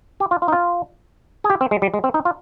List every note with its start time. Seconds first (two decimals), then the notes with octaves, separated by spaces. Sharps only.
0.20 G4
0.31 F4
0.42 F4
0.48 D#4
0.52 F4
1.44 G#4
1.50 G4
1.61 C4
1.71 G#3
1.82 G3
1.94 G#3
2.04 C4
2.14 D#4
2.25 F4